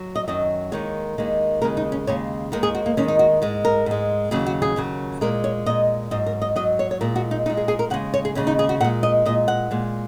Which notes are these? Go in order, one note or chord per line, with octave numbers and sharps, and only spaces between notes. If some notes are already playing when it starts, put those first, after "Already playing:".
Already playing: F#3
D#5
F#2 D#3 F#3 D#5
D#2 D#3 G#3 C#5
D#2 D#3 G#3
D#2 C#3 G#3 A#4
D#4
C#4
D#2 C#3 G#3 C#5
D#2 D#3 G#3 A#4
G#4
F#4
A#3
D#2 D#3 G#3 C#4
D#4
F#4
G#2 G#3
A#4
G#2 G#3
D#2 C#3 F#3 G#4
F#4
G#4
D#2 C#3 F#3
A#2 G#3 A#4
C#5
A#2 G#3 D#5
G#2 F#3 D#5
A#4
D#5
G#2 F#3 D#5
C#5
C#5
A#2 G#3 A#4
F#4
D#4
A#2 G#3 D#4
G#4
G#4
A#4
D#2 C#3 G#3 F#5
C#5
G#4
D#2 C#3 G#3 C#4
D#4
G#4
F#4
A#2 G#3 F#5
D#5
A#2 G#3 D#5
F#5
A#2 G#3